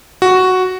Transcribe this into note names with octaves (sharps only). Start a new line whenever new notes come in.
F#4